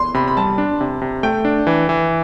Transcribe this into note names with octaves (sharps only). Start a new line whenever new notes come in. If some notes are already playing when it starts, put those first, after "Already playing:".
Already playing: C6
C3 B5
B5
G3 A5
D4
C3
C3
A3 G5
D4
E3
E3